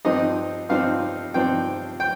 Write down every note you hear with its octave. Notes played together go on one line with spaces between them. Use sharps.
G2 F3 C4 D#4 D#5
G2 F3 C4 D#4 F5
G2 F3 C4 D#4 G5
G5